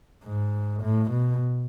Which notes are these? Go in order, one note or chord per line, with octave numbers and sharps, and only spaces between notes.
G#2
A2
B2